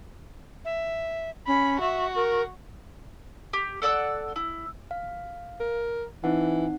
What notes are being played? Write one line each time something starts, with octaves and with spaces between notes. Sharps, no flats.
E5
C#4 B5
F#4 E5
A#4
G4
A4 D5 F#5 E6
E4
F5
A#4
E3 C4 D#4 F#5